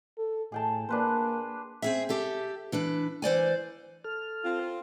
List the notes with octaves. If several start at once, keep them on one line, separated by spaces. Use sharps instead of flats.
A4
A2 G#4 G5 A5
A#3 D4 B4 C5
C4 G#4 E5
G4 A4 E5
E3 D4 B4
E3 C5 D5 G#5
A4 F6
C4 F4